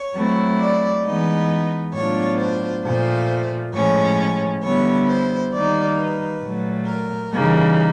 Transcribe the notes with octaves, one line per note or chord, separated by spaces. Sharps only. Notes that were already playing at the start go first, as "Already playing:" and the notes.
Already playing: C#5
F#3 A3 C4 E4
D5
E3 G#3 B3 D#4 D#5
A2 F#3 B3 D4 F4 C#5
C5
A#2 F3 A3 C5
A2 F3 G#3 C#4 C#5
D3 G3 B3 E4 C#5
C5
D#3 G3 A#3 D#4 D5
B4
A#2 F#3 A3
A#4
C#3 E3 G3 A#3 D#4